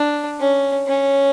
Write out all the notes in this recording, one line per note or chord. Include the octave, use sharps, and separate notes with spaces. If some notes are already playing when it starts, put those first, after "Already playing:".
Already playing: D4
C#4
C#4